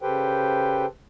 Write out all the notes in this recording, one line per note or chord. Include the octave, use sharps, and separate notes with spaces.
C#3 G4 A4 B4 C5 G5